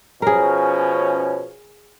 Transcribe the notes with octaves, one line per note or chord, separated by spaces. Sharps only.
B2 F3 C#4 G#4 A#4